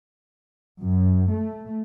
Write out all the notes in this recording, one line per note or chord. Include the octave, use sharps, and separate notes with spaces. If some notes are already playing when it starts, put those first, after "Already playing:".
F#2
A3